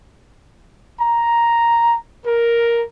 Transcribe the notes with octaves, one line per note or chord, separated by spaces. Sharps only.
A#5
A#4